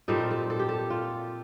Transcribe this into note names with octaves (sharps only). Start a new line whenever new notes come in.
A#2 G3 C4 D#4 A4
A#4
A4
A4
G4
A4
F4